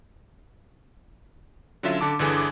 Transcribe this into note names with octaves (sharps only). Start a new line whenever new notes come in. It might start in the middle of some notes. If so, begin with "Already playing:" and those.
D3 F#3 C#4 F4 E5
D3 A5 D6
G1 D3 E3 G#4 G#5 D6